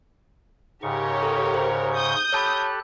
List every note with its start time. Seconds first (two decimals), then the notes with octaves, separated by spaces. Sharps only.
0.83 G#2 C#3 G4 A#4 C#5 C#6
1.23 A4
1.54 C5
1.94 D#6 G6
2.33 G4 A4 C#5 A5 B5 F#6